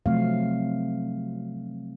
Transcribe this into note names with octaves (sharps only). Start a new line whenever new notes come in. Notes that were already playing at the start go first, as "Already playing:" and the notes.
C3 F3 F#3 A3 C4 F5